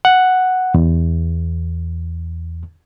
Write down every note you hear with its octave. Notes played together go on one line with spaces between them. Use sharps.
F#5
E2